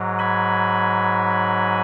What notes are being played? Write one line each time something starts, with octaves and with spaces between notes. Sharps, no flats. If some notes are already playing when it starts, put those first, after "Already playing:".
Already playing: G#2 F#3
G#5 B5